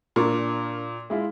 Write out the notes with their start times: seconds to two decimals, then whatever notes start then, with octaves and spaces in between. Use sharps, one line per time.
0.16 A#2 D4 A#4 C#6
1.10 G#3 E4 F4